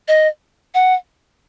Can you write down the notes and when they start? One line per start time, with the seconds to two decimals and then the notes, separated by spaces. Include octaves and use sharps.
0.08 D#5
0.74 F#5